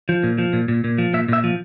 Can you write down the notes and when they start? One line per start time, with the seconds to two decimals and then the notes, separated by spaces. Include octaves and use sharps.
0.09 F3
0.23 A#2
0.38 F3
0.53 A#2
0.68 A#2
0.84 A#2
0.98 F3
1.13 A#2 E5
1.28 A#2 E5
1.44 F3